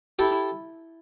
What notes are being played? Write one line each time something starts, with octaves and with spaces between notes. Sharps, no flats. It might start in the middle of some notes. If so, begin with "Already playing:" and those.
E4 G4 A4